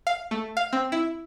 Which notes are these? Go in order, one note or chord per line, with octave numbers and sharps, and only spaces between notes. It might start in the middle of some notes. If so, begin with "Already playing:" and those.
F5
A3
F5
C4
E4